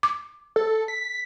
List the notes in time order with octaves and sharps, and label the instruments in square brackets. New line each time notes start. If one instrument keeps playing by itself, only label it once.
[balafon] D6
[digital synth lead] A4
B6